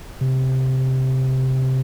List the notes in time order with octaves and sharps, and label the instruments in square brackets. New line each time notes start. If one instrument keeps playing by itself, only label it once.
[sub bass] C3